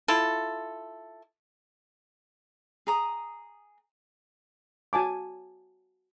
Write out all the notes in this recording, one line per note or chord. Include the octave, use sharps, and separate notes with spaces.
E4 F4 A4
G#4 A#5 D#6
F#4 G#5 A5 D6